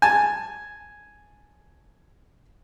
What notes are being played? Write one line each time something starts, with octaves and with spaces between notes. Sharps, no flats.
G#5 A5